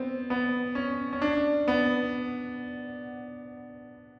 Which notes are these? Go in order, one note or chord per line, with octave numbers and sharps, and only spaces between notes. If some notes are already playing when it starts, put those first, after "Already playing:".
Already playing: B3 C4
B3
C#4
C#4
D4
B3